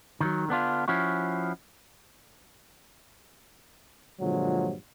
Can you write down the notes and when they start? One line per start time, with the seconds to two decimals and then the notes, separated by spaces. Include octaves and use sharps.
0.21 D#3 E3 F#3
0.49 D3 B3 D4 F4
0.88 F3 C#4 E4 F#4
4.21 G2 A#2 D3 F3 F#3 G#3